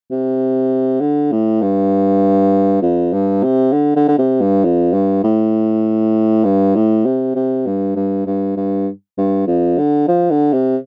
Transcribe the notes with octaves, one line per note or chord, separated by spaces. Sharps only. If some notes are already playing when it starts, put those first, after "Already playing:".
C3
D3
A2
G2
F2
G2
C3
D3
D3
D3
C3
G2
F2
G2
A2
G2
A2
C3
C3
G2
G2
G2
G2
G2
F2
D3
F3
D3
C3